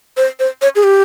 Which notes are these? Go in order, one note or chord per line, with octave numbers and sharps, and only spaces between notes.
C5
C5
C#5
G#4
G4